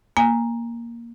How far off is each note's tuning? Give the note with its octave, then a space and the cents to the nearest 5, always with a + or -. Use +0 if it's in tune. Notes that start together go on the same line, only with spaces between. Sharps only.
A#3 +5 G#5 -15